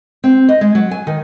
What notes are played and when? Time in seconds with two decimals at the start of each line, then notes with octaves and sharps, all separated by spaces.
0.24 C4
0.49 D#5
0.61 G#3
0.75 F#3
0.91 G#5
1.07 D#3